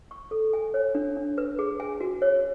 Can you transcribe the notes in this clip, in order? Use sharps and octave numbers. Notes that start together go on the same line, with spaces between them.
C#6
A4
G#5
C#5
D4
D4
B4
G#4
G#5
F#4
C#5